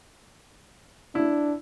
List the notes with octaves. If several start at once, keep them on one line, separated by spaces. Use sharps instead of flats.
D4 E4